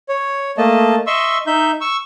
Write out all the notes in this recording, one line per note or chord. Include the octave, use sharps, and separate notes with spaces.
C#5
A3 A#3 D#5 A5
D#5 E5 C6 C#6 E6
D#4 E5 G6
C#6 E6